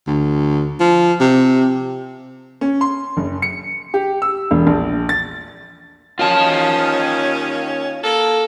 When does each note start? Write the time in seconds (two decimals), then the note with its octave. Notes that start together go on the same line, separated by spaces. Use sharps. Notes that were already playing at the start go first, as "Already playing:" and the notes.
0.07 D2
0.80 F3
1.20 C3
2.61 C#4
2.81 C6
3.17 F#1
3.42 C#7
3.94 G4
4.22 E6
4.51 E1
4.67 A#1
5.09 A6
6.19 D#2 D#3 C#4 F4 A5
8.02 A#3 A4